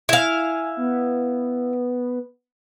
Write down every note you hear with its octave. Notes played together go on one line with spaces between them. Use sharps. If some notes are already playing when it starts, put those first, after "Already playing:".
E4 F5 G#5
B3